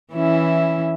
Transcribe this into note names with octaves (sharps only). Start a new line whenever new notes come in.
E3 C#4 E4